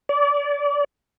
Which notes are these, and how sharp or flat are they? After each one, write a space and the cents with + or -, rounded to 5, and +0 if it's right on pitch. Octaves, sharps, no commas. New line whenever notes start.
D5 -30